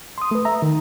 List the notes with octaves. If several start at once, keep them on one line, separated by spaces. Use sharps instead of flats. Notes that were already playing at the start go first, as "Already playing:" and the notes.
C6 D#6
A3 B4
E5 A#5
D#3